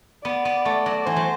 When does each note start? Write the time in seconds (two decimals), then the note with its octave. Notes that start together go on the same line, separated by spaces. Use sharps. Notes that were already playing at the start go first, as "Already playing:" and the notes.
0.25 B3 D5
0.45 B3
0.65 A3
0.86 F#3
1.06 E3 C5
1.16 F#3